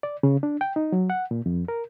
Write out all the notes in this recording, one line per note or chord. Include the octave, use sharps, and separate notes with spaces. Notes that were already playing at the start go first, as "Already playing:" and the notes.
D5
C#3
D4
G5
D#4
F#3
F#5
A#2
F2
A#4